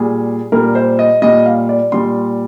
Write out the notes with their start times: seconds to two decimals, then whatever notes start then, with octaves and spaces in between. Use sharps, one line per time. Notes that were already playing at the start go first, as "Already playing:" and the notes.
Already playing: A#2 G3 G#4
0.52 A#2 G3 A#4
0.75 C5
0.99 D#5
1.22 A#2 G3 D#5
1.46 F5
1.69 D5
1.92 A#2 G3 C6